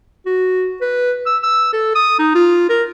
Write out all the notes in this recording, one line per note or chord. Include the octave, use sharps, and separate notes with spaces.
F#4
B4
E6
E6
A4
D#6
D#4
F4
A#4